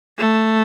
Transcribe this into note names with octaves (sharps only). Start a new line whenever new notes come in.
A3